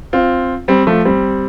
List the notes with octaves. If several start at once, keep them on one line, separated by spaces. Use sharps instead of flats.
C4 F4
G3 C4
F3 A3
G3 C4